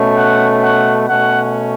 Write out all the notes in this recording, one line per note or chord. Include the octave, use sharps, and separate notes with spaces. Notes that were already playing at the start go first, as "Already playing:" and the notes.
Already playing: B2 A3 C#4
F#5
F#5
B2 A3 C#4 F#5